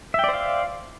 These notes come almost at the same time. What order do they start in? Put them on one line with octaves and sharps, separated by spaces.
E5 G5 D5 C5 F5